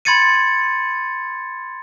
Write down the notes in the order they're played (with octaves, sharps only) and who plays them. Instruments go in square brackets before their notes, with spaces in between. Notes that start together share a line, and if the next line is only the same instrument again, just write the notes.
[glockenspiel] B5 C6 G#6 A6 C#7 D#7